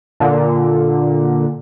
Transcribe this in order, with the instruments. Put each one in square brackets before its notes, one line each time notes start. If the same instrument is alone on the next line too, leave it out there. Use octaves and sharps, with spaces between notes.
[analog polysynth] A#2 D3